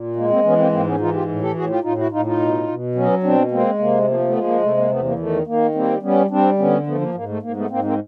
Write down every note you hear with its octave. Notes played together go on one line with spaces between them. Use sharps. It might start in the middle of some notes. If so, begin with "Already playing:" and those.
Already playing: A#2
G#3 A#3
A#3 C4
E3 B3 C#4
A#3 C4
G#2 A#3 C4
B3 C#4
E3 D#4 F4
F4 G4
A2
G4 A4
A2 F#4 G#4
F4 G4
A2 D#4 F4
E4 F#4
A2 D#4 F4
D#4 F4
B2
B2
F#3 B3 C#4
B2 C4 D4
G#3 A#3 C4
C3 A#3
F3 A#3
A#3
A3 B3
G#3
A#3
C3 A3
A#3
E2 A3 B3
A#3
D#3 A3
D#3 A#3
G3 A#3 C4
G3 B3 C#4
G3 C4 D4
D3 B3 C#4
F3 A3 B3
A#3
G#2 A#3
A3
G#2 A#3
A3 B3
G#2 A#3 C4
A#3 C4